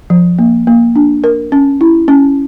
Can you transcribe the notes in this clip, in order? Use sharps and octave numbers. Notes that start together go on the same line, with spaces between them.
F3
A#3
A#3
D4
A#4
C#4
E4
C#4